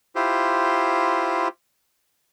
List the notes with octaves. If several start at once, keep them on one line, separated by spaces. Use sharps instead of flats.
E4 F4 G4 C5